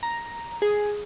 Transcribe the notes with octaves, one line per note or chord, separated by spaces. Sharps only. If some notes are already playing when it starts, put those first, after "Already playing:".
A#5
G#4